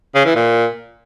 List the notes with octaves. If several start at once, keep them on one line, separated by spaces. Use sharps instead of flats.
C#3
E3
A#2